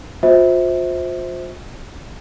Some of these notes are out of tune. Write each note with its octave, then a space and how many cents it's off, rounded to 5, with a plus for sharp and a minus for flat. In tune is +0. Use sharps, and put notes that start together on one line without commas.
F4 +40 C5 +0 E5 -30